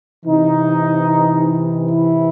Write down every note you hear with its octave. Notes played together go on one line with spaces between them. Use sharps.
C3 E3 D#4
E4